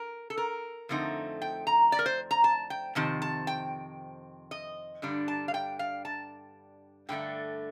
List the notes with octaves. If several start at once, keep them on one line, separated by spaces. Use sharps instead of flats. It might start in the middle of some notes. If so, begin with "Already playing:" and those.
Already playing: A#4
A4
A#4
F2 D3 A3 C4 D#4
G5
A#5
D5
A#4
C5
A#5
A5
G5
F2 C3 D#3 A5
A5
G5
D#5
G2 D3 G3 D4
A5
F5
G5
F5
A5
G2 D3 A3 D4 G5